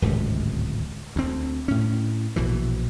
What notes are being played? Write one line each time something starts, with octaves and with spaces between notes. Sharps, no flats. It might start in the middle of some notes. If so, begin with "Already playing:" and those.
D1 G#1 C#2 C3
D2 C4
A2 C#4
A#1 B2 E3